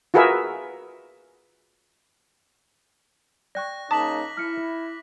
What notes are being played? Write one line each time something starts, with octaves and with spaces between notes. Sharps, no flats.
F4 F#4 G#4 A#4 B4 E5
D5 G5 C#6 F#6 A#6
C#3 A#3 D#4 A5 D6 D#6 B6 F#7
E4 F6 C#7